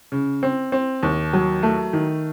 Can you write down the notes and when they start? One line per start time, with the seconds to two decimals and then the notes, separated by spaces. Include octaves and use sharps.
0.12 C#3
0.43 C4
0.72 C4
1.03 D#2
1.33 F#3
1.63 A3
1.93 D#3